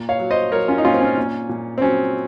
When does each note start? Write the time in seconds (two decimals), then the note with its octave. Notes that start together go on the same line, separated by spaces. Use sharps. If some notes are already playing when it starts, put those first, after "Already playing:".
Already playing: A#2
0.09 C#5 F5
0.20 F#3
0.31 C5 D#5
0.52 F#3 A#4 C#5
0.68 C#4 F4
0.78 D#4
0.85 A#2 C#4 F4
0.94 C4
1.01 C#4
1.17 A#2
1.49 A#2
1.78 C4
1.82 F#3 C#4